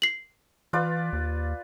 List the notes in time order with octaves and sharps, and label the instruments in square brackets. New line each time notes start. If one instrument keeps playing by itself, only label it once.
[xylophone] C7 F#7
[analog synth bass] E3 [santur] F4 B4 D5
[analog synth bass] D#2